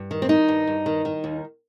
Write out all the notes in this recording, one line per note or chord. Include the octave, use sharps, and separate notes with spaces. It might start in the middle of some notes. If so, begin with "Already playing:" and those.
Already playing: G2
D#3
C4
D#3 D#4
G2
G2
D#3
D#3
D#2